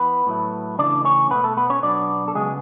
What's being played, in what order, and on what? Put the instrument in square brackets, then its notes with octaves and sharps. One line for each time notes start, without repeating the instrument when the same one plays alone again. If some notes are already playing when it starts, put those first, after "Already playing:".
Already playing: [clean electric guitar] E3 B3 B4
A2 F#3 A3
C#3 E3 A3 D4 D5
C#4 C#5
B2 A3 B3 B4
A3 A4
B3 B4
C#4 C#5
B2 F#3 B3 D4 D5
A4
C#3 F#3 G#3 B3 G#4